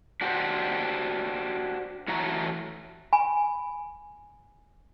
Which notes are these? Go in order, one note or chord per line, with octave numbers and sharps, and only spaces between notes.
D4 F#4 G4 A#4 C5
A2 E3 F#3 A3 F#4 A#5
G#5 B5